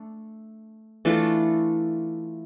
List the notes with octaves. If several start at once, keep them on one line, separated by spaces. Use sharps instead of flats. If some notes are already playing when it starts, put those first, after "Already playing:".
Already playing: A3 D4
E3 A3 D4 F4